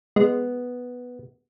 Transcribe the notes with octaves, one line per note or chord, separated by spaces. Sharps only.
G#3 B3